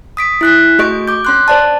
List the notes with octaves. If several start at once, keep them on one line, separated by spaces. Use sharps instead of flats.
D#6 B6 D7
E4 F#6 B6
A3 F#4 G#4 D#5 C#6 D7
D6 G6
C#4 C6 F#6
C5 D5 A5